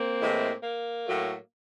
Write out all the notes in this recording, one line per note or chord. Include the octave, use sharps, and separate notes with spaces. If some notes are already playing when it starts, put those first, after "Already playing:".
Already playing: A#3 C4
A2 E3 G#3
A#3
A2 F#3 A3